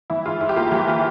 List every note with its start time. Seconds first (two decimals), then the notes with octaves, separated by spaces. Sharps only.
0.10 E3 E4
0.25 G#2 F4
0.40 G#2 E4
0.49 G4
0.56 A#3 F4
0.71 E3 G4
0.88 F4